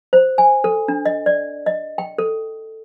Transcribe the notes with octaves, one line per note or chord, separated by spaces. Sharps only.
C5
G#5
A4
D4
D#5
D5
D#5
G5
A4